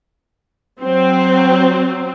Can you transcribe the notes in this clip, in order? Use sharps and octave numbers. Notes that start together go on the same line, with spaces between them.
F#3 C4